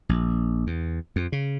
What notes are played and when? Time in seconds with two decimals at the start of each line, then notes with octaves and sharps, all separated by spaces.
0.09 A#1
0.67 E2
1.16 F2
1.32 C#3